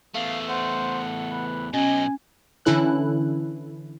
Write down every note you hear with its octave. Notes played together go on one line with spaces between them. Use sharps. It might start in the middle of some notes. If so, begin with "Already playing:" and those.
E2 A3 F5
C5 F#5
B4
B2 F#3 C#4 D#5 G#5
D3 E3 C#4 E4 A4 F#6